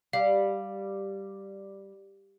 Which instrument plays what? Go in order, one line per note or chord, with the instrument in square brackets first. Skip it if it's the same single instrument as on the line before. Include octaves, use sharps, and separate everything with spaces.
[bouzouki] G3 [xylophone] F5